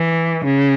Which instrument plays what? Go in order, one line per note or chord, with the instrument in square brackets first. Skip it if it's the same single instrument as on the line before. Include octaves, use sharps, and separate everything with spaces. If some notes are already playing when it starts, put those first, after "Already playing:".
Already playing: [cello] E3
C#3